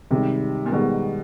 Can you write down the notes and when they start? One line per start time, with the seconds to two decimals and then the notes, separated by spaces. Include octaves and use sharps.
0.10 G#2 C3 D#3 G3
0.66 A#2
0.72 G#2 B2 D#3 G3